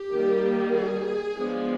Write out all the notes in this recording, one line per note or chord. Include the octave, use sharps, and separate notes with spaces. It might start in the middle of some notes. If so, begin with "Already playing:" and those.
Already playing: G4
D#3 G3 A#3
G#4
F3 G#3 B3 D4